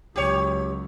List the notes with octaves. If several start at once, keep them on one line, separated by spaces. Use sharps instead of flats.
C#2 F#3 G4 C#5